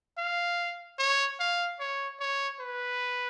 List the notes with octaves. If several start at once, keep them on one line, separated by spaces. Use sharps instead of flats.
F5
C#5
F5
C#5
C#5
B4